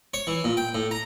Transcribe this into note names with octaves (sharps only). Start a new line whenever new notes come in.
C#5
E3
A#2
G5
A2
A#5